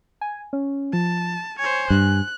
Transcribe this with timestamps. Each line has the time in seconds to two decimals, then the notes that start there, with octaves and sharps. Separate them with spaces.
0.21 G#5
0.53 C#4
0.93 F3 A5
1.59 C5 C#5 G#5
1.90 G2 F#6